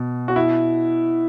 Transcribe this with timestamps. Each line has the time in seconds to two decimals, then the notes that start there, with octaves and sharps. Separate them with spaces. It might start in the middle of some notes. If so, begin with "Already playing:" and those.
Already playing: B2
0.28 F#4
0.36 E4